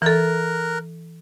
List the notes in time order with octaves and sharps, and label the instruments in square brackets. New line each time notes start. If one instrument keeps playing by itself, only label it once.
[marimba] E3 A4 [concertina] A#4 F#6